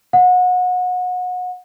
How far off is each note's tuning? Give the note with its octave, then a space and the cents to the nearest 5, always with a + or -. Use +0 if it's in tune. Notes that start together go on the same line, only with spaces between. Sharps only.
F#5 -30